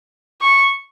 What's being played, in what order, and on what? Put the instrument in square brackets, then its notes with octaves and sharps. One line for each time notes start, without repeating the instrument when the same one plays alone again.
[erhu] C#6